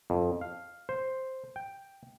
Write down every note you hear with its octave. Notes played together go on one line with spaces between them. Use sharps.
F2
F5
C5
G5